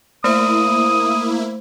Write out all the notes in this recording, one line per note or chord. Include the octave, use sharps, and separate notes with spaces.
A3 A#3 E4 C5 D#6